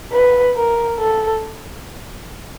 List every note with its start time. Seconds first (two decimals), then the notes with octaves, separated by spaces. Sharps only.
0.12 B4
0.56 A#4
0.99 A4